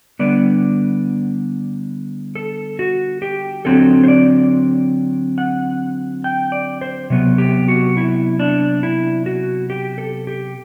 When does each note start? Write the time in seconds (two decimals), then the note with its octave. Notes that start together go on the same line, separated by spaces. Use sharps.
0.19 D3 G3 B3 D5
2.35 A4
2.79 F#4
3.22 G4
3.65 D3 F#3 C4 A4
4.03 C5
4.08 D5
5.38 F#5
6.24 G5
6.52 D5
6.81 C5
7.10 C3 F#3 B3
7.38 G4
7.68 F#4
7.97 E4
8.39 D4
8.83 E4
9.26 F#4
9.70 G4
9.98 A4
10.27 G4